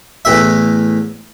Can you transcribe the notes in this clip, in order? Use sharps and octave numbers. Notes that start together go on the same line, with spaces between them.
E2 A2 E5